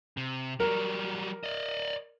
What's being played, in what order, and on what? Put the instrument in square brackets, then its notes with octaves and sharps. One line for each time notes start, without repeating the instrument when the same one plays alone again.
[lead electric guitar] C3
[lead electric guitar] F#3 G3 [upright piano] A#4
[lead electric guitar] D5 D#5